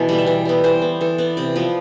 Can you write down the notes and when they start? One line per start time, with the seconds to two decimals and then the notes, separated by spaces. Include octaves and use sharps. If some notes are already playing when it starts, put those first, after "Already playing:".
Already playing: B2 E3 A4 B4
0.09 G3 B3
0.18 E5
0.27 E3 D5
0.45 G3 B3
0.64 E3 C5
0.82 B3
1.01 E3 A4
1.18 B3 D5
1.37 C3 D5
1.56 F3 B3